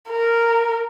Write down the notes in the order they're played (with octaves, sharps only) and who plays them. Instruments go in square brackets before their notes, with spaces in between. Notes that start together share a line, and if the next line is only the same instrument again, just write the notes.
[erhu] A#4